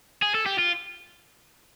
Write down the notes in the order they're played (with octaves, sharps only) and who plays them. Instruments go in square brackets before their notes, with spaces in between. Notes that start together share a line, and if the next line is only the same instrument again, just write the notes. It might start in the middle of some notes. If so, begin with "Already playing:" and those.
[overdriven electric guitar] G#4
A4
G4
F4